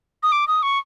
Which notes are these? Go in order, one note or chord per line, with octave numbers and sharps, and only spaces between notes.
D#6
D6
D#6
C#6